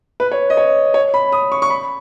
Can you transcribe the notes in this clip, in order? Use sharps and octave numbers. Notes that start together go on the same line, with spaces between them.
B4
C#5
D#5
C#5
C#5
B5
D#6
C#6
C#6
B5